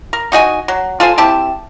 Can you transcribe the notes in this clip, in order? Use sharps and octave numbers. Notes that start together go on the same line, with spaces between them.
A#4
D#4 F#4 D#5 G#5
F#3
F4 A4 C5 G#5
C4 E4 G4 A5